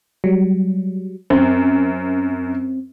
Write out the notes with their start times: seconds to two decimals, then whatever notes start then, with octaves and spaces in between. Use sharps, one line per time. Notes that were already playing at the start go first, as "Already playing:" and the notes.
0.24 F#3 G3
1.30 F#2 C4